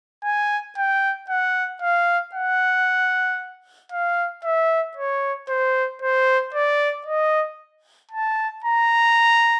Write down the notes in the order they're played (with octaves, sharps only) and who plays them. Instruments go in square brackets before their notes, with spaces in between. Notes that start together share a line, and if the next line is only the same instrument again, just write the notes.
[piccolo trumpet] G#5
G5
F#5
F5
F#5
F5
E5
C#5
C5
C5
D5
D#5
A5
A#5